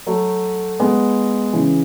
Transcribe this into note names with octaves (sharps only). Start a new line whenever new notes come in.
F#3 A3
G#3 B3
C#3 E3